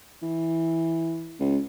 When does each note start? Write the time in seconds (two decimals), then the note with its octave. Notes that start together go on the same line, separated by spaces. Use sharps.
0.22 E3
1.40 C#2